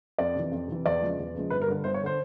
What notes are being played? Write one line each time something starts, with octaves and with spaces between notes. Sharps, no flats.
F2 D5
C3 E3
F2
C3 E3
E2 D5
C#3 F3 G#3
E2
C#3 F3 G#3
G1 B4
A#4
G2 D3
G1 C5
C#5
D3 C5